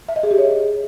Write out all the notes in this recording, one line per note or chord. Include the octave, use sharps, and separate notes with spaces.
E5
D#5
G#4
G4
C#5